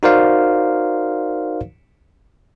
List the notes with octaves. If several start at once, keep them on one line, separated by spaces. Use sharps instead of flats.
D#4 F#4 A#4 C5 D5 F5